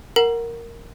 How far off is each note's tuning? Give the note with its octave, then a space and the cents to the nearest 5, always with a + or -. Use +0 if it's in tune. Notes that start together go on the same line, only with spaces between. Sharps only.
A#4 -5 F#5 +0 A#5 +20